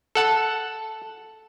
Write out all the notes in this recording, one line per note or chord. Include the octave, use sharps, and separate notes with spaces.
A4 F#5 A5